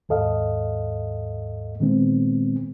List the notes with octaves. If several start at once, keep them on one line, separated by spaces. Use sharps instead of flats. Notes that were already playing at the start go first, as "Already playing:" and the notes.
D#2 G#2 A4 D#5 F5
A#2 D#3 G#3 B3 C4